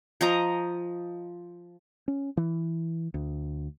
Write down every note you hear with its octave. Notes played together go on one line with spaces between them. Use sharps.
F3 D#5 A#5
C#4
E3
D2